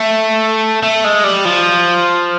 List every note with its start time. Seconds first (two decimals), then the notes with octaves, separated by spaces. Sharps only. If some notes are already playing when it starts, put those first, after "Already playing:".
Already playing: A3
0.83 A3
1.04 G#3
1.24 G3
1.45 F3